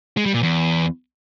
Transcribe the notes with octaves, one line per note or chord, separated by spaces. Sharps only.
G#3
G3
A#2
E2